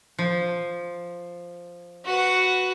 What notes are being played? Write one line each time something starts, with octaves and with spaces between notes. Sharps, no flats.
F3
F#4 B4